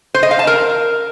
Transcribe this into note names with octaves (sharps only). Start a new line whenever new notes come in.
C5
D#5
F5
A5
A#4